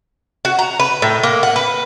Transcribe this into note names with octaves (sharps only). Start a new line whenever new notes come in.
F#4
A#5
B4
A2
A#3
F#5
B4